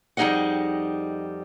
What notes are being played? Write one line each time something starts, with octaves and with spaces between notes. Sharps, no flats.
F2 G3 D#4 G#4 D#5 F#5